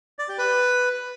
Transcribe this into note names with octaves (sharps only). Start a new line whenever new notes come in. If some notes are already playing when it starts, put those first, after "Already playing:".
D5
G4
B4